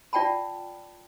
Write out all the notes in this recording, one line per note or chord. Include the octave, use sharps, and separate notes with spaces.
F4 D5 F#5 G5 A5 B5